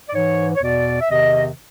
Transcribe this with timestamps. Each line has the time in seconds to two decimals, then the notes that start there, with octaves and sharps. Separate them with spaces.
0.08 D5
0.14 G#2 E3 C#5
0.55 C#5
0.63 E2 B2 D5
1.01 E5
1.10 E2 C3 D#3 D#5